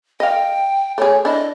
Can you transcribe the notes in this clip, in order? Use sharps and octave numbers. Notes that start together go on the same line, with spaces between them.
D#5 F5 G5
A3 G#4 C#5
D4 E4 D#5